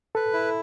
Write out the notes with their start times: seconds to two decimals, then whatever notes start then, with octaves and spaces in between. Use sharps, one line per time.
0.15 A4 B4
0.33 E4